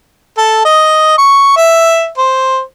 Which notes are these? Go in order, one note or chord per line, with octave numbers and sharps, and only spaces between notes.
A4
D#5
C#6
E5
C5